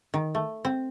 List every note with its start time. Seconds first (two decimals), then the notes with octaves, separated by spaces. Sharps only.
0.14 D#3
0.35 A3
0.65 C4